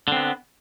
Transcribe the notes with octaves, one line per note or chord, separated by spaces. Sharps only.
D3 B3 C4